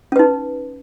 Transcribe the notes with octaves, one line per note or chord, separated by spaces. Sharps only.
C#4 D#4 B4